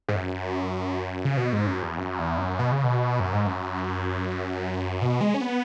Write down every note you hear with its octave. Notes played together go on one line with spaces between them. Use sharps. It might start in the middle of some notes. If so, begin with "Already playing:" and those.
G#2
F#2
C#3
B2
G#2
F#2
E2
F#2
E2
F#2
B2
C#3
B2
F#2
G#2
F#2
B2
G#3
C#4
B3